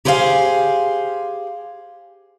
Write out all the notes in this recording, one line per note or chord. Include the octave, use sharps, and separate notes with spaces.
G4 G#4 C5 D5 F5 G#5